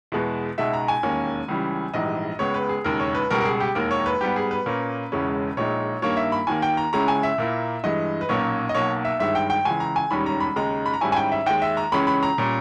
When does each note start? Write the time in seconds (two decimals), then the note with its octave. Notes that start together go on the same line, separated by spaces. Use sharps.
0.12 E2 B2 G#3 B3
0.58 C#2 B2 G#3 D#4 E5
0.73 A#5
0.88 G#5
1.03 E1 D#2 D#3 A#3 C#4
1.48 C#2 C#3 E3 G3
1.94 A#1 G#2 E3 G3 D#5
2.39 C#2 C#3 G#3 B3 C#5
2.54 B4
2.69 G#4
2.84 E1 D#2 C#3 A#4
3.00 C#5
3.15 B4
3.30 C#2 B2 G3 A#4
3.40 A#4
3.45 G#4
3.60 G4
3.75 E1 D#2 D#3 A#3 A#4
3.91 C#5
4.06 B4
4.21 G#2 G3 B3 G4
4.36 G#4
4.51 B4
4.66 A#2 A#3 C#4
5.12 E1 E2 C#3 G#3 C#4
5.57 A#1 A#2 G#3 D#4 C#5
6.02 G2 D#3 A#3 C#5
6.17 E5
6.32 B5
6.47 D#2 D#3 A#3 G#5
6.62 G5
6.77 A#5
6.93 C#2 C#3 G#3 C#4 E4 A#5
7.08 G#5
7.23 E5
7.38 A#2 A#3 E4
7.84 G2 E3 G#3 D#5
8.21 B4
8.29 B1 A#2 A#3 C#4 C#5
8.69 D#5
8.74 B1 B2 A#3 C#5
9.05 E5
9.20 G1 G2 D#3 G#3 E5
9.35 G5
9.50 G5
9.65 C#2 C#3 E3 G#5
9.80 A#5
9.96 G#5
10.11 E1 D#2 D#3 G3 C#4 B5
10.26 A#5
10.40 B5
10.56 D#2 C#3 G#3 D#4 A#5
10.86 B5
10.93 A#5
11.01 G#2 D#3 G3 C#4 E4 G#5
11.12 G#5
11.16 G5
11.32 E5
11.46 D#2 D#3 G#3 G5
11.62 E5
11.77 A#5
11.92 C#2 C#3 E3 G#3 C#4 B5
12.07 B5
12.23 A#5
12.38 A#2 G3 C#4